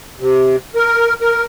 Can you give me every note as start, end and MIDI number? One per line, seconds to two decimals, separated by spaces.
0.20 0.56 48
0.75 1.14 70
1.21 1.45 70